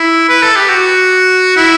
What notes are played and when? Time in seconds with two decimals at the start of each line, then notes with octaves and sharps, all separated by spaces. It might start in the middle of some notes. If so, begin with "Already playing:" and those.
Already playing: E4
0.29 B4
0.42 A4
0.56 G4
0.69 F#4
1.57 E4